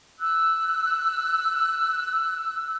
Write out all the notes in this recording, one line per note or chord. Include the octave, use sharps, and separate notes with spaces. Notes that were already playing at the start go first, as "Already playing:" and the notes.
E6 F#6